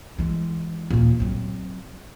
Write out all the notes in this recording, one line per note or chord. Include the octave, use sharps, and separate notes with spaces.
E3 G#3
D#2 A#2
F#3 C4